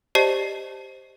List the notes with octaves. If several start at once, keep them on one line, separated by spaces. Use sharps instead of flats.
G4 C5 D5 D#5 A5 C7